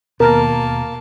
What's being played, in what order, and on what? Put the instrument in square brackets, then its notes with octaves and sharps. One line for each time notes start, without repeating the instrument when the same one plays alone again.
[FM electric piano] D#2 [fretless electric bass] B2 [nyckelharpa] A#3 A5 [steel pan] A#4